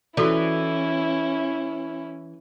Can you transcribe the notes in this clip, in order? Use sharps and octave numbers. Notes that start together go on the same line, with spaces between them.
E3 C#4 E4 F#4 A4 D5